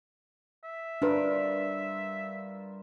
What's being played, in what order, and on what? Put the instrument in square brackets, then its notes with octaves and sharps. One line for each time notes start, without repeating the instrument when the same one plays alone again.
[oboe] E5
[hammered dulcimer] G2 F4 A#4 [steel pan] D4 B4